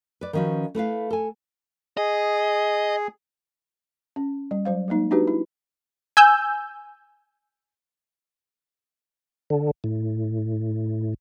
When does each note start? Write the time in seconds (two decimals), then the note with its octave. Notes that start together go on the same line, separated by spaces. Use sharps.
0.21 B4 D5
0.33 D#3 F3 C#4 F#4 B4
0.75 A3 E4 B4 F5
1.10 A4 G#5
1.97 G#4 D#5
4.16 C#4
4.51 G3
4.65 F#3 C5 F5
4.88 F#3 G#3 A#3 D#4
5.11 D4 D#4 F#4 G4 B4
5.27 E4
6.17 G#5 E6 G6
9.50 D3
9.84 A2